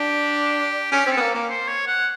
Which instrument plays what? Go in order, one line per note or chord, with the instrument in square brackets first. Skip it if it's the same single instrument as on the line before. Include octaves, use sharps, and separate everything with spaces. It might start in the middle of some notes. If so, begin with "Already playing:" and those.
Already playing: [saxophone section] D4 [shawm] G4
[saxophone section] C#4 [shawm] G4
[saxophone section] C4
[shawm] A4
[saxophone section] B3
A#3
A#3
[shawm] C5
C#5
F#5